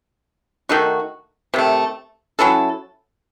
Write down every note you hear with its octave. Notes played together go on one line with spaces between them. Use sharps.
D#3 A3 D#4 F#4
C3 D#3 A3
F#3 C#4 E4 A4